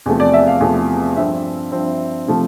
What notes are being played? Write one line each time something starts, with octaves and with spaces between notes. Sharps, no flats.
E2 C3 F3 A3
D5
E5
F5
E2 C3 F3 A3
G2 F3 C4 E5
G2 F3 C4
C3 F3 A3